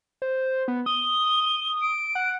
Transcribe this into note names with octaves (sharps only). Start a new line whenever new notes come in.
C5
B3
D#6 G7
D7
F#5